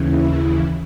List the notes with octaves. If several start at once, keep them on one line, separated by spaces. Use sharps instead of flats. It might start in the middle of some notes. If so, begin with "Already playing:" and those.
Already playing: D#2 C#3 E3
E4